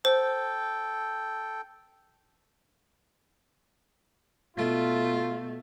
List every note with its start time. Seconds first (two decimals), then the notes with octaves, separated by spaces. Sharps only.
0.05 A4 C5 G5
4.57 B2 A3 F4